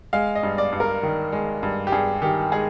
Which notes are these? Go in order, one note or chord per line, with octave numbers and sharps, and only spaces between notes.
G#3 F5
D#5
G2
D5
G2
A#4
D#3
G#3
G2
G4
G2 G#4
D#3 G4
G#3 G#4